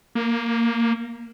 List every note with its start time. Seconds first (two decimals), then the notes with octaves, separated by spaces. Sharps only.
0.15 A#3